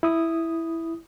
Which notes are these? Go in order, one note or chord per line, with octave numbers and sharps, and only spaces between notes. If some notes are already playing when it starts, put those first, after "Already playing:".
E4 D#6